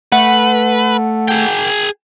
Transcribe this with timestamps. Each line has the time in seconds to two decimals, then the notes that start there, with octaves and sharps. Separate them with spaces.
0.12 A3 B4 F#5
1.28 G#4 G5